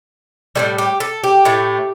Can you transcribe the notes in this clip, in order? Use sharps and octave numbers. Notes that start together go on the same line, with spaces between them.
A2 E3 G3 A4
G4
A4
G4
A2 A3